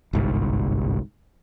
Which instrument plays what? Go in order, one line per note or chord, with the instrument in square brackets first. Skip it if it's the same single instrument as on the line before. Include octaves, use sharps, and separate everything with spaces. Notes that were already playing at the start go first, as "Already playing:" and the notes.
[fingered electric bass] G1 C2 G#2